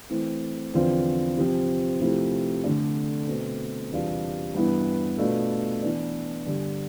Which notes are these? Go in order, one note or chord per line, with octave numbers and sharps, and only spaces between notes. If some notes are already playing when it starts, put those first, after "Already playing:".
E3 A3 C4 E4
E2 D3 F3 C4 F4
C3 F3 C4
C3 F3 A3 E4
D3 A3 D4 A4 D5
B2 A3 C4
E2 C3 G3 D4 F4
G2 E3 B3 E4 G4
B2 A3 D4 F4
E3 B3 D4
G2 D3 G3